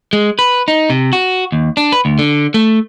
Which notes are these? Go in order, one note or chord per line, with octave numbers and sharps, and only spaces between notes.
G#3
B4
D#4
C3
F#4
D#2
D4
B4
D2
D3
A3